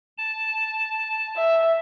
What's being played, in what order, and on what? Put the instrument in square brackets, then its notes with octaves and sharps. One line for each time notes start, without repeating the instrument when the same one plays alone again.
[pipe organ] A5
[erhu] E5